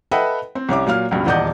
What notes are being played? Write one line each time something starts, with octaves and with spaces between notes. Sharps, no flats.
A4 B4 D#5 E5 F#5 G5
C4
C2 C#4 E5 D6
A#2 F#3 F5 F6
C#2 G2 B2
D#1 E2 D5 D#5 F#5 G6